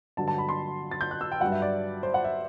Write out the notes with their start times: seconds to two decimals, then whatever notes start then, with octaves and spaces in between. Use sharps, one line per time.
0.17 G2 D3 F#3 A5
0.28 A5
0.38 B5
0.49 C6
0.91 A6
1.01 G6
1.11 F#6
1.21 E6
1.32 G5
1.41 G2 F#3 F#5
1.52 E5
1.62 D5
2.03 C5
2.14 F#5
2.24 E5